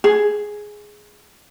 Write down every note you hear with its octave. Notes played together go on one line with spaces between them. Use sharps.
G#4